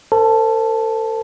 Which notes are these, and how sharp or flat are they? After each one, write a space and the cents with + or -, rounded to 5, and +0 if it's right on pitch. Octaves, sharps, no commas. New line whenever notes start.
A4 +40 C5 -25 A5 -5